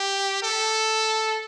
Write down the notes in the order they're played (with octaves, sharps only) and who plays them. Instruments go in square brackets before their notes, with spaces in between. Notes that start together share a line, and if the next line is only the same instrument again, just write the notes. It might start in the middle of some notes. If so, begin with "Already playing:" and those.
Already playing: [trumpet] G4
A4